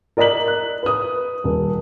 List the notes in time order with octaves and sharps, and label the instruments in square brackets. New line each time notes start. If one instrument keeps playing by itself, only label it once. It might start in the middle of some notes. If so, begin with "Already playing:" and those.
[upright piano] A#4 D5 D#5 A#5 B6 F#7
F#6
B4 D#6
D#1